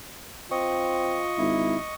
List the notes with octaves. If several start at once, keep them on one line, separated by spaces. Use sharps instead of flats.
C4 F4 D#5 C#6
G#1 E4